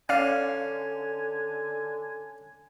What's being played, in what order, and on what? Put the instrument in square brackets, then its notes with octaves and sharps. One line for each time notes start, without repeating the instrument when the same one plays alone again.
[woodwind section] D3 G#5 [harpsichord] C#4 [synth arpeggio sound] D5 F5